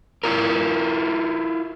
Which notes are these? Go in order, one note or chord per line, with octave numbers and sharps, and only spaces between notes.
E4 F4 A#4